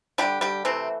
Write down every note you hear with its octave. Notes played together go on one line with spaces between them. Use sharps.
D3 G3 A3 D4 G4
G3 G4
C3 E3 A3 C4